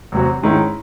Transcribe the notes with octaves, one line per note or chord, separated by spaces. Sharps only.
E2 C3 F#3 C4 F#4
G#2 D#3 G#3 C#4 E4